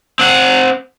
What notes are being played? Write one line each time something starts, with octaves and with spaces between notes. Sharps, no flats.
C4 F#5